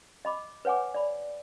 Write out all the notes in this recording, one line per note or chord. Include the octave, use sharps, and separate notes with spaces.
D#5 B5 D6
B4 C#5 F#5 G#5 D6
D5 B5